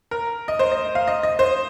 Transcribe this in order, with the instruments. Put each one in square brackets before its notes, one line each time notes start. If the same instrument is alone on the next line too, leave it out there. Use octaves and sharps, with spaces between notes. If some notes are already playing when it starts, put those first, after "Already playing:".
[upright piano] A#4
D#5
C5
D#5
F5
D#5
D#5
C5